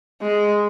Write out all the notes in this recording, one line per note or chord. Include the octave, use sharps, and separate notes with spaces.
G#3